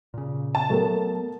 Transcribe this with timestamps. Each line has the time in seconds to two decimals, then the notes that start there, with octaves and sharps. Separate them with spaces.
0.14 A#2 C#3
0.55 A5
0.70 F#3 A3 B3 A4 A#4